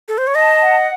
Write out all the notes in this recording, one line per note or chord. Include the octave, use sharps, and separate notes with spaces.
A4
C5
C#5
D#5 A5
F#5